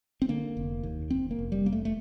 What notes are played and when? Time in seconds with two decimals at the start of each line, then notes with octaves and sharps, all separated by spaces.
0.22 C4
0.29 D3 A#3
0.57 F1
0.83 D#2
1.10 F1 C4
1.31 A#3
1.39 F1
1.52 G3
1.65 F1 A#3
1.72 A3
1.85 A3